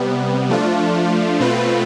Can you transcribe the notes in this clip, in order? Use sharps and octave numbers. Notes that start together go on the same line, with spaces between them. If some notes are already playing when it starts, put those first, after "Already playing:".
Already playing: C3 G3 B3
F3 A3 D4 F4
B2 A3 C4 F4 B4